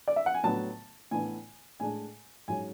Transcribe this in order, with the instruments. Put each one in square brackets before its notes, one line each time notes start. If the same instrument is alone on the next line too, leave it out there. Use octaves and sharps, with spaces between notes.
[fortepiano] D5
E5
F#5
G#5
A2 F#3 B3 D4 A5
A2 E3 B3 D4 G#5
A2 G#3 D4 G#5
G#2 F#3 C#4 G#5